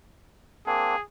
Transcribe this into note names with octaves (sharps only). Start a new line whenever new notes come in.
A#3 C4 D4 G#4